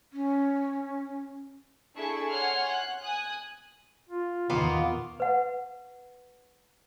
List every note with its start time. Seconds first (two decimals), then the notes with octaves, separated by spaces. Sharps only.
0.13 C#4
1.95 D4 E4 G#4 A4 E5 C#6
2.30 C#5 F#5 G#5 C6 F6
2.69 F#6
3.02 G#5 D#6 F#6
4.09 F4
4.50 E2 A#2 D#3 A#3 B3 F4
5.20 B4 F#5